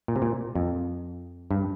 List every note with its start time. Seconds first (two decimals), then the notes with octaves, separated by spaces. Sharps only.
0.08 A#2
0.16 C3
0.22 A#2
0.55 F2
1.51 G2